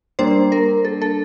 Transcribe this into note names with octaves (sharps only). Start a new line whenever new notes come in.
G3 A#3 D4 C5
A#4
A4
A4